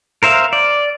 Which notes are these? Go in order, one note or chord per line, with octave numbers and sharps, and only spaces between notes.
A#4 C5 E5 F5
D5